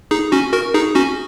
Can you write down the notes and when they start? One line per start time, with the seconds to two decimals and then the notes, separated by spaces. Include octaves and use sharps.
0.11 D#4 G#4
0.32 C#4 F#4
0.53 F#4 A#4
0.74 D#4 G#4
0.95 C#4 F#4